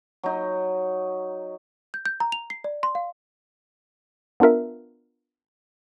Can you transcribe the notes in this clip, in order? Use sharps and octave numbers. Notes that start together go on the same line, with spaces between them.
F#3 D#4
G6
G6
A#5
F7
C7
D5
C6
F5
B3 D4 F4 A#4 E5